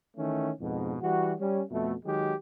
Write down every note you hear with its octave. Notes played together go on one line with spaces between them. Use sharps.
D#3 E3 A3 C#4
F2 G#2 B2
E3 G3 F#4
G3 C#4
F2 B2 A3
D#3 F#3 G#3 G4